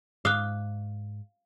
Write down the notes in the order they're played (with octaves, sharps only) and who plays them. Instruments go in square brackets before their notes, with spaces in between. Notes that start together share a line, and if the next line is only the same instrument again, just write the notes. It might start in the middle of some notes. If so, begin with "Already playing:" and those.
[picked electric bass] G#2 [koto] F5 [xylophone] D6 D#6 F#6